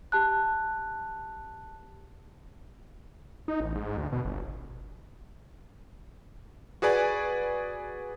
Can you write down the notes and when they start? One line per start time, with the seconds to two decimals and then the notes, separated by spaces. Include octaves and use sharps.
0.12 G4 A5 F#6
3.48 D#4
3.60 A1
3.75 G#2
3.97 D2
4.12 B2
4.25 G1
6.82 F#4 G#4 B4 D5 G#5